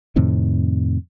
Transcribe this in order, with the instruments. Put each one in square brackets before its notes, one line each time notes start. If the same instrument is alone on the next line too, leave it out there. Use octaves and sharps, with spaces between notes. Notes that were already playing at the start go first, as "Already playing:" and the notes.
[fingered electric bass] F2 A2 C3 D#3